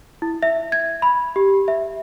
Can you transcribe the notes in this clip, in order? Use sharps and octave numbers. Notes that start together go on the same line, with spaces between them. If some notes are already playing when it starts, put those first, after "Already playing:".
E4
E5
G#6
B5
G4
E5